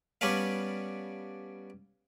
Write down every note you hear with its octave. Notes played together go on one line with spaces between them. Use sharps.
G3 B3 C#4 D4 B4 F5